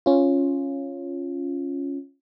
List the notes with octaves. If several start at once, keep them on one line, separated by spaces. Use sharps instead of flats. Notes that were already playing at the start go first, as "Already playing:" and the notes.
C#4 F4